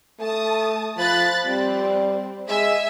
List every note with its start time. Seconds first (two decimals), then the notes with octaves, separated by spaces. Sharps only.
0.20 A3 A5 D#6
0.97 F3 B5 F#6 A6
1.45 G3 C4
2.49 G#3 E5 G#5 E6